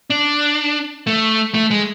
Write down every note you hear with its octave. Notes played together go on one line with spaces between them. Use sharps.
D4
A3
A3
G#3